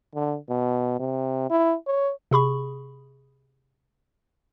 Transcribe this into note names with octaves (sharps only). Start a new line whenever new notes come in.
D3
B2
C3
E4
C#5
C3 G#4 B5 C#6